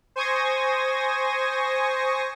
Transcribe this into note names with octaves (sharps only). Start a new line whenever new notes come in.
C5 G#5 C#6 D#6 G#6 A#6